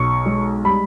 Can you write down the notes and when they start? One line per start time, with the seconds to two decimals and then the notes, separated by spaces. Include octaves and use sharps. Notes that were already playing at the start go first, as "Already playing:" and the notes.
Already playing: B1 C#6
0.26 G#3
0.64 G3 B5